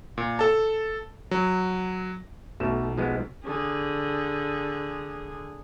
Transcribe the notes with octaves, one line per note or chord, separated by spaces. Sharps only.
A#2
A4 A5
F#3
B1 B2 A3 E7
F3 G#3 B3
D3 G#4